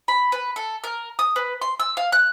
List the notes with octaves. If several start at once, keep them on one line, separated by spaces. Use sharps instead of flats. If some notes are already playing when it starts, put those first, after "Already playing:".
B5
B4
A4
A#4
D#6
B4
C6
E6
F5
F#6